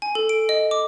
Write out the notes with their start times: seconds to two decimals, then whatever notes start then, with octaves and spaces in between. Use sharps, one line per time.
0.02 G#5
0.15 A4
0.29 D7
0.49 D#5
0.71 D6